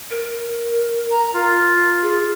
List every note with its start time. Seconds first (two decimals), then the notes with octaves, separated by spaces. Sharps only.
0.10 A#4
1.11 A#5
1.34 F4
2.02 G#4